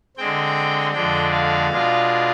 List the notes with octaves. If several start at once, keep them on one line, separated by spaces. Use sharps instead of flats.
D3 G#3 C4 G5
F2 D3 G#3 D4 G5
F5
B2 G#3 D4 F4